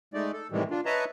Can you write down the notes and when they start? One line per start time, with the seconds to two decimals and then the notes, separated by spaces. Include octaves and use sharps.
0.14 G#3 A3 D#4 D5
0.33 A4
0.51 A2 C3 D#3 E3 G3 G#3
0.70 D4 F4
0.86 B4 C#5 D#5 E5 A5 A#5